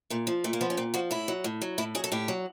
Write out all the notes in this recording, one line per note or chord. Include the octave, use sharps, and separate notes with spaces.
A#2 A3
F3 A3
A#2 A3
A#3
F3 B3
C#4
A#2 C4
F3 F#4
A2 E4
F#3
A2
F#3
A2 E4
F#3 G#4
A4
A2 G4
F#3